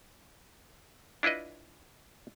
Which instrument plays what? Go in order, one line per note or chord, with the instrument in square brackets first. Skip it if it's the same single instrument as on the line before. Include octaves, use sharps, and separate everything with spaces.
[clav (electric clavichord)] D4 E4 F4 B4 D#5